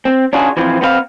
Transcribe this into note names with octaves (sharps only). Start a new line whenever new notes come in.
C4
C#4 D4 F4 F#4 G#4
E3 F3 C4 F4
B3 C4 B4 F5